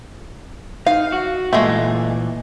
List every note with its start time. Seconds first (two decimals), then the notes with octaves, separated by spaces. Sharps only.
0.86 D#4 F5
1.12 F#4
1.53 A#2 E3 G#3 A3